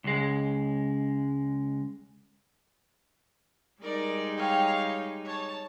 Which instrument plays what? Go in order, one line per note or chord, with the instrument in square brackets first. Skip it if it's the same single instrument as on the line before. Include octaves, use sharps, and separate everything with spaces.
[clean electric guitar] C#2 G#3
[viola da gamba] G3 G#3 D#4 [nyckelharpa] A#4 D5
[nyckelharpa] C#5 F5 [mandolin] G5 F6
[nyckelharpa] C#5 A5